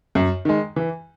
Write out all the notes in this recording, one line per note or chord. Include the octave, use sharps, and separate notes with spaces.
F#2
D#3 G#3
E3